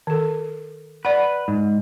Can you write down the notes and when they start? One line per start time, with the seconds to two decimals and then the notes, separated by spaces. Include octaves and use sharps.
0.07 D#3 A4
1.05 B4 D5 F#5
1.48 G#2